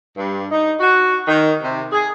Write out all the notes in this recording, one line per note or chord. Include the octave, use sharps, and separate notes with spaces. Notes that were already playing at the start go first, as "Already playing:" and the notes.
G2
D#4
F#4
D#3
C3
G#4